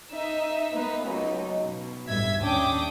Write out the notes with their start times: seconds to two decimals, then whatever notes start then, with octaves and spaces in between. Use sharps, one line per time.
0.13 D#4 E5
0.73 A#3 B3 D#4 B4
1.05 C#2 F#3 A3 D#4
1.66 B2
2.08 A1 G2 E5 G#6 B6
2.41 D#2 C#4 D4 G5 D6 D#6